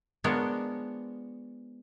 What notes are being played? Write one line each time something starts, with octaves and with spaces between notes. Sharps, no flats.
F3 G#3 B3 D4 A#4 C#5